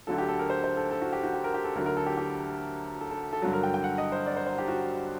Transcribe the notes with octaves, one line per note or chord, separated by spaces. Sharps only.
D2 D3 F#3 A4
G4
A4
A#4
C5
C5
A4
A4
F#4
G4
F#4
G4
A#4
G4
A4
D2 D3 F#3 A#4
A#4
A4
G4
G4
A4
A4
A4
G2 D3 F#3
A#4
G5
G5
F#5
D#5
C5
D5
C5
C5
G4
F#4